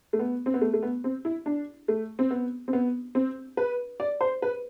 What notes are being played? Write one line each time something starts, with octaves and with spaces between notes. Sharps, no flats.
A3
B3
C4
B3
A3
A3
B3
C4
E4
D4
A3
C4
B3
C4
B3
C4
B4
D5
C5
B4